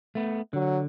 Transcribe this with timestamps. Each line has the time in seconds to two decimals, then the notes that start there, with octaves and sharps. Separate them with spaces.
0.15 A3 B3
0.53 D3 F#3